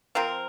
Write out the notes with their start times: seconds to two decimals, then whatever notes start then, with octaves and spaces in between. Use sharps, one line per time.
0.15 F3 C4 F4 A#4